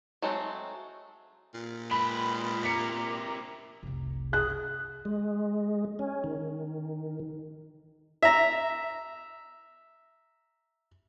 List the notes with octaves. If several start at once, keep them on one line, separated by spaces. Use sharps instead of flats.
F#3 G#3 A3 C4
A#2
G#3 B4 B5
C3 A#3 A#5 D6 B6 C#7
F1 C2
G#4 F#6
G#3
C#4
D#3
E5 A#5